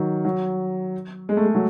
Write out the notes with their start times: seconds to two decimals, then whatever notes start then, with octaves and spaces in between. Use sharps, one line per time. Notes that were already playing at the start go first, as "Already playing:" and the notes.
Already playing: D#3 F#3
0.25 F#3
1.29 G#3
1.37 A3
1.46 G#3
1.55 F#3